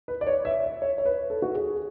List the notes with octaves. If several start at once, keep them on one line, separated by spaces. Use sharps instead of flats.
B4
D5
C#5
E5
E5
C#5
C#5
B4
A4
F#4
G#4